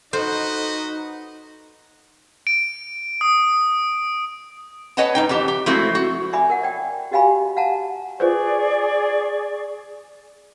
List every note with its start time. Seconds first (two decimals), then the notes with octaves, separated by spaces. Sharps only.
0.13 D#4 F#4 A4 B4 C5 D#5
2.47 D7
3.21 D#6
4.97 B4 C#5 D#5 F#5 G#5 A5
5.15 G#2 D#4 G5
5.29 F2 E3 G4 A5
5.48 G4
5.66 F3 G#3 A3 C4 E4 F#4
5.95 F#4
6.33 D5 E5 G#5 B5 D6
6.50 A#4 F#5
6.63 D5 G5
7.11 F#4 G4 D#5 F5 G#5 B5
7.57 F5 F#5 A5 A#5
8.20 F4 G#4 B4 C5 D5 C#6